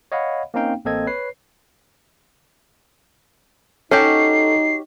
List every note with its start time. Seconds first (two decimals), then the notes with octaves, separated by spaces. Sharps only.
0.12 C#5 D#5 F5 F#5 B5
0.54 A#3 C4 C#4 D#4 F5 G5
0.85 A1 A#3 C4 A4 D#5 G#6
1.07 B4 C#5 C7
3.91 C#4 D#4 F#4 G4 A4 C7